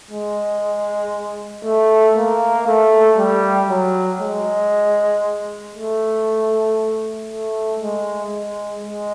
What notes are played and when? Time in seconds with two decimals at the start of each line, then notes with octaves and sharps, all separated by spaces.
0.11 G#3
1.64 A3
2.16 A#3
2.67 A3
3.18 G3
3.69 F#3
4.21 G#3
5.74 A3
7.28 A3
7.80 G#3
8.31 G#3
8.83 G#3